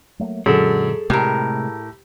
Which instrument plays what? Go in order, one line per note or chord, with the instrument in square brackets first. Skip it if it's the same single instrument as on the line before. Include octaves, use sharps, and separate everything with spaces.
[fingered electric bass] F#3 A3 A#3
[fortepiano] F#2 [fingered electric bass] A#2 D3 G#3 [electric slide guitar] G#4 A4
[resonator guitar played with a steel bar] A2 A#4 [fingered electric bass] C3 G#3 A3 [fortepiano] G4